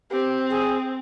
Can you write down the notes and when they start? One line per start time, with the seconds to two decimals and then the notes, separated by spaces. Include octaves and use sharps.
0.10 C4 G4
0.50 G#4